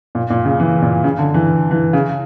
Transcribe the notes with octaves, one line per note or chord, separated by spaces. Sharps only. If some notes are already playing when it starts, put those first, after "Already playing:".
A#2
A#2
C#3
E3
A#2
C#3
D3
E3
E3
C#3